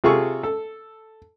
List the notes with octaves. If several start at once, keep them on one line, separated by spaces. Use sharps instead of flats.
C3 F4 G#4 A4 C#6
A4